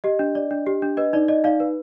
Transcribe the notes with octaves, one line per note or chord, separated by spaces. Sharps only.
G4 D#5
D4
D5
D4
G4
D4
B4 D#5
D#4 D5
D5 D#5
D#4 D5 F5
B4